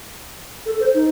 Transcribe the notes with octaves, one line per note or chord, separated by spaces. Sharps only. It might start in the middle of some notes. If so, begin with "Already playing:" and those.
A4
C5
D#4